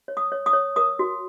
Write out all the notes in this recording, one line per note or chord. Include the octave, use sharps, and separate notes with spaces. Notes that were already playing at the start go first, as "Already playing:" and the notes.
C#5
D#6
C#5
D#6
C#5
A#4 D#6
F#4